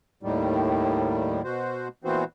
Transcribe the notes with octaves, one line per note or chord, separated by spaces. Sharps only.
D#2 A2 D#3 G3
B2 F#4 C5
A#2 E3 B3 C4 F#4 C5